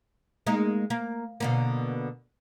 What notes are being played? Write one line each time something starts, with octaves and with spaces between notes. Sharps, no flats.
G#3 A#3 D#4
A#3
B2 D3 A#3